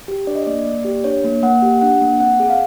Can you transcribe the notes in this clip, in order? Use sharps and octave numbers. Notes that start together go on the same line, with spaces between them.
G4
D4 D5
D#5
A#3 D5
A#3 D5
G4
D4 C#5
A#3
A#3 F#5
G4
D4 F#5
A#3
C4 F#5
G#4
F5